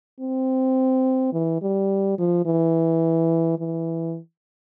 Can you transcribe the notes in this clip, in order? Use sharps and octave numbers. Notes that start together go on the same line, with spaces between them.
C4
E3
G3
F3
E3
E3